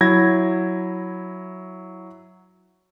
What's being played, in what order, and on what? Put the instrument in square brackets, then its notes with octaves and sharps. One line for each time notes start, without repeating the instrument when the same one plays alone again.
[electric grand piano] F#3 E4 G#6 A#6